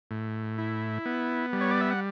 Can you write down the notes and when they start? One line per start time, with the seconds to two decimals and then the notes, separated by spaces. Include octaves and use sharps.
0.11 A2
0.58 E4
1.06 B3
1.53 G3
1.61 C#5
1.71 D5
1.81 E5
1.91 F#5